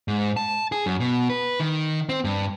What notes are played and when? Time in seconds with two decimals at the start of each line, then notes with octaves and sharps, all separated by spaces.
0.08 G#2
0.37 A5
0.72 G#4
0.86 F#2
1.00 B2
1.30 B4
1.60 D#3
2.09 C4
2.24 G2